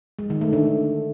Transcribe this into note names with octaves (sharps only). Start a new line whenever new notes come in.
G#3
D#3
A3
D3